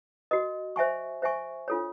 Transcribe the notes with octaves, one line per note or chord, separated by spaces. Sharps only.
F#4 A#4 D#5
C5 E5 G#5 C#6
C5 E5 G#5 C#6
D4 F4 A4 C#5